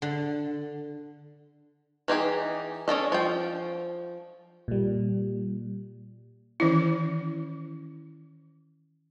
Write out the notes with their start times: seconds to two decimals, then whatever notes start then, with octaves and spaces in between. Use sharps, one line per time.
0.02 D3
2.08 E3 D#4 G4 G#4
2.88 C#4 D4 A4 D#5
3.12 F3 G5
4.68 A#2 G3
6.60 D#3 E3 C#4 E4